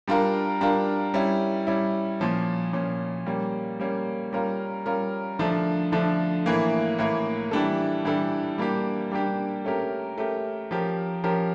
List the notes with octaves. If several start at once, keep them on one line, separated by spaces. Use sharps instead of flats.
G3 D4 F4 A#4
G3 D4 F4 A#4
G3 C#4 E4
G3 C#4 E4
A#2 F3 C#4
A#2 F3 C#4
G3 A#3 C#4
G3 A#3 C#4
G3 C#4 F4 A#4
G3 C#4 F4 A#4
D3 F3 A3 D4
D3 F3 A3 D4
A2 E3 A#3
A2 E3 A#3
E3 G3 D4 A4
E3 G3 D4 A4
G3 A#3 D4 G4
G3 A#3 D4 G4
A3 C#4 G4 A#4
A3 C#4 G4 A#4
F3 C#4 G4 A#4
F3 C#4 G4 A#4